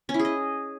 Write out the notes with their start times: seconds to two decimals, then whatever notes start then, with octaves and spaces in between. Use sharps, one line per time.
0.09 C#4
0.14 E4
0.19 G#4
0.25 D#5